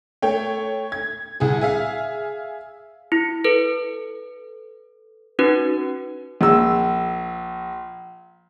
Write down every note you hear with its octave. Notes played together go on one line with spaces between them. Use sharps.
A3 C#5 G5
G#6
C2 G#4
G#4 E5 F5
E4
A4 B4
C#4 D#4 F#4 B4
A#1 E6